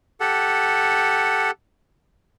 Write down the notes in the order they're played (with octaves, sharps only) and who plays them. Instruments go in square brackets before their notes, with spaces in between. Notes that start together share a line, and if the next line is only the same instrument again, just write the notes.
[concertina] G4 A4 F#5